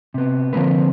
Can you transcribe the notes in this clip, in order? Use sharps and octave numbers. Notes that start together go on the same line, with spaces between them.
C3 B3
D3 F3 A#3 C4 B4